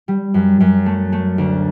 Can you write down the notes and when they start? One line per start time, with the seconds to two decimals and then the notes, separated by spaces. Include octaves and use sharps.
0.08 G3
0.34 F#2
0.60 F#2
0.86 A3
1.12 A3
1.38 D2